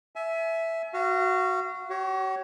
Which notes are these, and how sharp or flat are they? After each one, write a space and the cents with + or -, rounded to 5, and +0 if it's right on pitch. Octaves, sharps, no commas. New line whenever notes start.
E5 +0 G#5 +35
F#4 +0 F5 -35
F#4 +45 C#5 +0